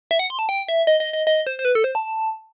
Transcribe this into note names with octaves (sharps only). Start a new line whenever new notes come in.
E5
F#5
C6
A5
G5
E5
D#5
D#5
D#5
D#5
C5
C5
B4
A4
C5
A5